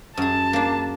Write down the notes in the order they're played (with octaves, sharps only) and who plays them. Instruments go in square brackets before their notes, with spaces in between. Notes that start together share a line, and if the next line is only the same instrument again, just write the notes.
[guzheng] F#2 G#4 [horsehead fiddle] A5
[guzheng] A#3 D4